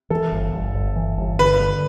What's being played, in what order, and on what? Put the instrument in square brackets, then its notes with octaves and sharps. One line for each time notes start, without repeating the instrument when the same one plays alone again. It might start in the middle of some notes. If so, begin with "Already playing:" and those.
[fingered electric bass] E3 [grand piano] A4
[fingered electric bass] G1
G1
G1
E3
G1
[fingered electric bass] D3 [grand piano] B4
[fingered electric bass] D3